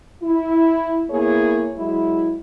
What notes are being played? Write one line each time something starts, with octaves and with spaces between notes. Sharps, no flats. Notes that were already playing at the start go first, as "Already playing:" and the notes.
E4
A#3 B3 E4 G#4 C#5
F#3 G#3 E4